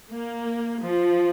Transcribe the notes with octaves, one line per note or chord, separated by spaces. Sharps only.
A#3
F3